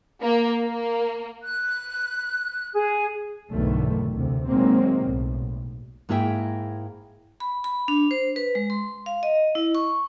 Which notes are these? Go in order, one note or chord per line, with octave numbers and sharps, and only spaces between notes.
A#3
A#3
F#6
G#4
B1 E2 G2 D3 D#3 A3
D2 C3
C3 D#3 F#3 G#3 A#3 C4
B1 A2
G#2 A#3 E4 G#4 E5 G5
B5
B5
D4
C5
B4
G#3
C6
F5
D#5
E4
C#6